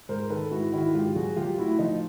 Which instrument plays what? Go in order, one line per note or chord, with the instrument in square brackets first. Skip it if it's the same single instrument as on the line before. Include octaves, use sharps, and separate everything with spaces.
[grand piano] G#2 A#4 C5
D#3 A4 B4
G#2 E4 F#4
D#3 E4 F#4
G#2 F4 G4
F#3 F#4 G#4
F#3 F4 G4
A2 E4 F#4
F3 D#4 F4